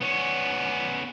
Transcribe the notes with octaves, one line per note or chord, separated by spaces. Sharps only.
B3 C#4